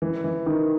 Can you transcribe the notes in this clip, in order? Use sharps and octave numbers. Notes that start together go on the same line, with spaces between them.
E3
E3
D#3